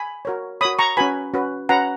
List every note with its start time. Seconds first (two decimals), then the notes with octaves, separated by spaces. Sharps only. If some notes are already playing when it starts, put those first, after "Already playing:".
Already playing: G#5 B5
0.25 F#4 A#4 C#5
0.61 F#4 A#4 C#5 B5 D#6
0.79 A#5 C#6
0.97 C#4 F#4 B4 G#5 B5
1.34 C#4 F#4 B4
1.69 C#4 F#4 B4 F#5 A#5